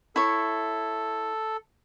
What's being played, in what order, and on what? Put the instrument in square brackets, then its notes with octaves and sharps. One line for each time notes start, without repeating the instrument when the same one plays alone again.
[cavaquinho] E4 C#5 [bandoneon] A4